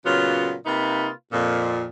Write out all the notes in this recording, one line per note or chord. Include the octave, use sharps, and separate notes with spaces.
A#2 C#3 F#3 B3 F4
C3 A#3 D#4 F4 B4
F2 A#2